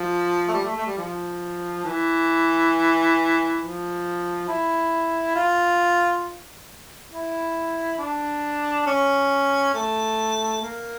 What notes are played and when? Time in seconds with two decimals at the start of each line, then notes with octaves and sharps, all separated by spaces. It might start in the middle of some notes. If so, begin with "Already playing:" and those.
Already playing: F3
0.48 A3
0.54 G3
0.65 A3
0.76 A3
0.86 G3
0.98 F3
1.85 E3
3.61 F3
4.48 E4
5.36 F4
7.11 E4
7.98 D4
8.86 C#4
9.74 A3
10.61 A#3